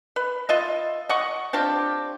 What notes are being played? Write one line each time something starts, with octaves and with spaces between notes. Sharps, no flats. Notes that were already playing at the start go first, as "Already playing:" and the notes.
B4
F4 D#5 E5
D#5 F#5 C#6
C4 D4 F4 G4